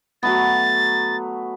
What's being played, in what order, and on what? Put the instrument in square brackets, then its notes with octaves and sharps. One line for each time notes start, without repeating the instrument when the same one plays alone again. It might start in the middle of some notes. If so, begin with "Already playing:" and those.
[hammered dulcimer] F#3 A3 B3 [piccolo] A6